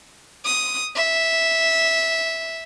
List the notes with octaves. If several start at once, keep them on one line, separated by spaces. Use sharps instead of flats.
D#6
E5